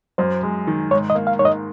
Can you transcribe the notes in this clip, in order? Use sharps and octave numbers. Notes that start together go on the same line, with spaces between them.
F#2 C5
G#3
D#3
G#2 C#5
D#5
A#3
F5
G#2 C#5
D#5